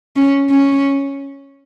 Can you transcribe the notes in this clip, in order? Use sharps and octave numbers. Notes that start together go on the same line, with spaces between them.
C#4
C#4